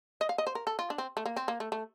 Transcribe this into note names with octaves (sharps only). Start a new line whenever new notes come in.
D#5
F5
D#5
C5
A#4
A4
F4
D4
C4
A3
A#3
C4
A#3
A3
A3